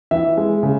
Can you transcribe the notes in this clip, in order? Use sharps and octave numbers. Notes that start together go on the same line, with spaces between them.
E3 E5
G#3
C#3